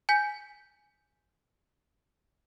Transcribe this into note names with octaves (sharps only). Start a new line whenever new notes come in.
G#5 G6 B6